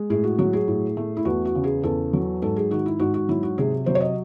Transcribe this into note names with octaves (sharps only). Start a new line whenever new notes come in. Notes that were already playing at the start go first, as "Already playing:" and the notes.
Already playing: G#3
A2 G#4
F#4
F#3 F#4
G#4
A2
A3
E4
E2 F#4
F#4
C#3
G#4
E2 A4
F#3
G#2 A4
G#4
D#3 F#4
E4
G#2 F#4
F#4
F#3 E4
F#4
C3 G#4
F#3 C5
C#5
D#5